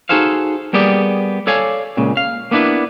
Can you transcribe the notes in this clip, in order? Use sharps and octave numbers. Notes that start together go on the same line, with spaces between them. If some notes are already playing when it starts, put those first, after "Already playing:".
D#4 F#4 G#4 A4 C5 F5
G3 A#3 B3 G4 G#4 D5
A4 C#5 D5 F5 G#5
C#2 A#2 C#3
F5
A#3 B3 D4 E4 B4